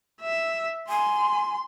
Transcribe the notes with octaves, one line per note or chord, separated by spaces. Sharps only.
E5
G#5 C6